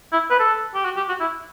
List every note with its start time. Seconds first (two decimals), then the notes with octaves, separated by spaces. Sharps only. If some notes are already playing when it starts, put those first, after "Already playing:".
0.12 E4
0.30 B4
0.39 A4
0.75 G4
0.85 F#4
0.96 G4
1.09 F#4
1.20 E4